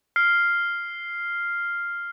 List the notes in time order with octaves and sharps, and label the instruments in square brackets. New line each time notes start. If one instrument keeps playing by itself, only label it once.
[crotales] F6 C7